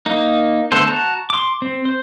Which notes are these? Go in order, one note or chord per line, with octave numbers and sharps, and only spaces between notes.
A#3 D#4
D3 A3 B3 A4 C5
F#4 A5 A#5
C6 D6
C4
C5